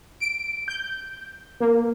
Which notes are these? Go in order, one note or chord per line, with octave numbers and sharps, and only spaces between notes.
D7
G6
A#3